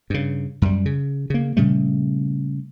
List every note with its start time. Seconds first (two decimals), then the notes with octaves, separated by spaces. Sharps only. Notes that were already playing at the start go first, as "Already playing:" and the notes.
0.10 G2 C#3
0.62 F#2 G3
0.86 C#3
1.30 C#3 A#3
1.57 A#2 C#3 G3 A3